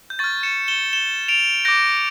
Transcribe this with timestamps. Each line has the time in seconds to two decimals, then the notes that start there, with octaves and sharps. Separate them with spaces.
0.10 G6
0.19 C#6 F6 A6
0.43 C#7 E7
0.68 E7 G7
0.93 E7 G7
1.28 D7 F7
1.65 D6 G6 A#6 D7